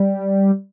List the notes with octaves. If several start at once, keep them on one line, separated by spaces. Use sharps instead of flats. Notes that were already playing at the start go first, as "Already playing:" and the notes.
Already playing: G3